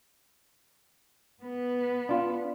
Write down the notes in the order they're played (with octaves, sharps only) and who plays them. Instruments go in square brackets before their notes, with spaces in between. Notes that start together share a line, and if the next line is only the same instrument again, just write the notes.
[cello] B3 B4
[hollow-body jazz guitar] D4 F4